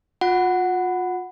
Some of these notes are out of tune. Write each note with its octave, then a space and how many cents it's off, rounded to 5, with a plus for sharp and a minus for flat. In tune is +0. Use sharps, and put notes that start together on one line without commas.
F4 +35 F#5 +0